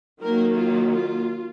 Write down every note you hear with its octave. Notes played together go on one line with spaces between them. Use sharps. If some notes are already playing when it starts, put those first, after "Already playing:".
D#3 F#3 A#3 A#4
F4
F4